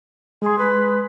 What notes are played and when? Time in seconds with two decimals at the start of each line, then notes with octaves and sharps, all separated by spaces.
0.42 G#3 G#4 C6
0.58 B4